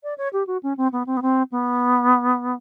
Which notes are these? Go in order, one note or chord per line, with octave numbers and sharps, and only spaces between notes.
D5
C#5
G4
F#4
C#4
C4
B3
C4
B3
C4
B3